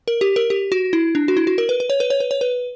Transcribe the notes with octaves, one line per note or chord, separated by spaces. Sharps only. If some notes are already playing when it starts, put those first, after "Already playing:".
A#4
G4
A#4
G4
F#4
E4
D4
F#4
E4
F#4
A#4
B4
B4
C#5
B4
C#5
B4
C#5
B4